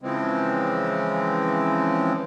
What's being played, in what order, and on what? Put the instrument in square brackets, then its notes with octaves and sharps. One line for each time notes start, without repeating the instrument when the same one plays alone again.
[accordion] C#3 E3 F3 G#3 C4